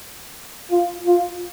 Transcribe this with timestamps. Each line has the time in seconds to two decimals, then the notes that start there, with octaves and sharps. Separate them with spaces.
0.71 F4
1.06 F4